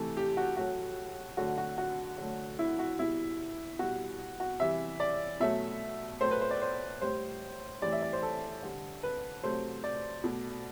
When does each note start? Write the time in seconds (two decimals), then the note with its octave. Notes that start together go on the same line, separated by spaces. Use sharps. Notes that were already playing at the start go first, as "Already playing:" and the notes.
Already playing: C3 E3 A3 A4
0.17 G4
0.37 F#4
0.57 A2 F#3 A3 F#4
1.37 D3 F#3 A3 F#4
1.58 F#4
1.78 F#4
2.18 D3 F#3 A3
2.59 E4
2.79 F#4
2.99 B2 G3 E4
3.79 B2 G3 F#4
4.40 F#4
4.60 C3 E3 G3 E5
5.00 D5
5.40 B2 F#3 A3 E5
6.21 A2 F#3 A3 C5
6.31 B4
6.41 C5
6.51 D5
6.62 C5
7.01 A2 G3 C5
7.82 A2 E3 G3 D5
7.92 E5
8.02 D5
8.13 C5
8.23 A4
8.62 D3 G3
9.03 B4
9.43 C3 F#3 A3 C5
9.84 D5
10.24 B2 A3